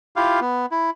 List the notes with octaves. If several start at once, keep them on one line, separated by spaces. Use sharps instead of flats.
E4 F4 G4 F5
B3
E4